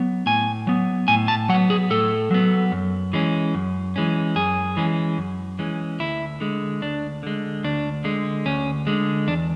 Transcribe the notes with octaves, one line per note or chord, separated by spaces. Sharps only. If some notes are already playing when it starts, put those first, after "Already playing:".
Already playing: F#3 B3
A2 G#5
F#3 B3
A2 G#5
A5
F#3 F#5
B3
G#4
A2 A4
F#3 B3
F#2
E3 G#3 C#4
F#2
E3 G#3 C#4
F#2 G#4
E3 G#3 C#4
F#2
E3 G#3 C#4
D2 E4
D3 G#3
D2 D4
D3 G#3
D2 D4
D3 G#3
D2 C#4
D3 G#3
E2 D4